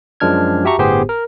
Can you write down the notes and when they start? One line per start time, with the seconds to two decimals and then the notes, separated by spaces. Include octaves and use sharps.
0.20 F#2 F3 G#3 D4 F6 G#6
0.65 F#4 G4 E5 A5 A#5 C#6
0.78 G1 A2 B3 G4 G#4 C5
1.09 A#4